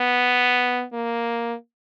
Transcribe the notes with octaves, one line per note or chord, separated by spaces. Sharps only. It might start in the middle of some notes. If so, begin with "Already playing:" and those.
Already playing: B3
A#3